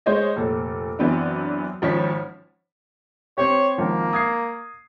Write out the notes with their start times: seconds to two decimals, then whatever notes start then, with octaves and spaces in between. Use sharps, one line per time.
0.06 G#3 C5 C#5 D#5
0.36 F1 A#2 A4
0.99 F#2 E3 F#3 B3 C4 D4
1.82 G#1 F3 C#4 C#5 B5 B6
3.38 C4 G4 C#5
3.78 G#1 F3 A#3
4.13 D#6 G#6 C7